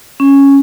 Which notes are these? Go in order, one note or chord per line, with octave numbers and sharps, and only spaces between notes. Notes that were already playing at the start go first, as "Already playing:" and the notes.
C#4